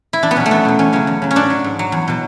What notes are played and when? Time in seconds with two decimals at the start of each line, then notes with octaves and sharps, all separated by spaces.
0.13 E4
0.23 E2 D4
0.31 B3
0.36 B2 F#3 C#4
0.46 A3
0.51 E2 B3
0.65 B2 F#3
0.79 E2 C#4
0.93 C#3 F#3 C#4
1.07 E2
1.22 C#3 F#3
1.31 C#4
1.36 G#2 D4
1.50 F#3
1.64 G#2
1.79 F#3
1.92 E2
2.08 B2 F#3